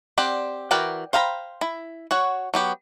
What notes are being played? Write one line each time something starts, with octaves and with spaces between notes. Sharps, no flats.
C4 G4 D5 F#5
E3 F#4 A#4 D5 G5
C5 F5 G5 A#5 B5
E4
F#4 C#5 F#5
F#3 B3 G4